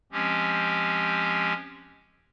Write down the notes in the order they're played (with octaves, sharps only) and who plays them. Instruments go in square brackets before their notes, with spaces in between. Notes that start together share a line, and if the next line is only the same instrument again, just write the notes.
[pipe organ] F3 G#3 C4 C#4 G4